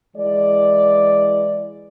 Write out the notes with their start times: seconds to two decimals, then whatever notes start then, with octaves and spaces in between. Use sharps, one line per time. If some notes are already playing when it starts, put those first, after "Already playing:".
0.16 E3 G#3 D5